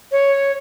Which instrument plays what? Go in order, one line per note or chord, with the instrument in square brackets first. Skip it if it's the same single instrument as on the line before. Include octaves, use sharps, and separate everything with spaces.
[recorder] C#5